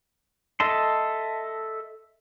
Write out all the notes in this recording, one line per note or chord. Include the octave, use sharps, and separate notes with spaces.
A4 D#5 E5 A5 C6